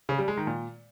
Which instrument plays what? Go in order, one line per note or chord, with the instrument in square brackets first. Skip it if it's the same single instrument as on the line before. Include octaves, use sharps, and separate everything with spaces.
[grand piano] C#3
G3
G#3
D#3
A#2